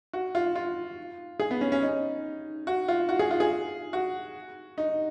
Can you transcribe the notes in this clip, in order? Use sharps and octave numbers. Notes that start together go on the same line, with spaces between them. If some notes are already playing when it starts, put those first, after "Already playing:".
F#4
F4
F4
G#4
B3
C#4
C#4
D#4
F#4
F4
F#4
G#4
F4
G#4
F#4
D#4